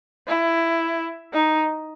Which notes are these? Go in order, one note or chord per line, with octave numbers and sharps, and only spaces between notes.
E4
D#4